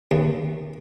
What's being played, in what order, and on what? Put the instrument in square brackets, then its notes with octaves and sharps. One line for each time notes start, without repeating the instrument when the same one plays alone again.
[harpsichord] D#2